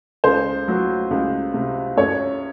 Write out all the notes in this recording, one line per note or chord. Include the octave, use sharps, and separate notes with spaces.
C#2 C5
F#3
C#2
C3
F#2 C#5